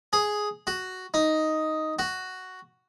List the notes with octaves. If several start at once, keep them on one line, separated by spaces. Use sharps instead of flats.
G#4
F#4
D#4
F#4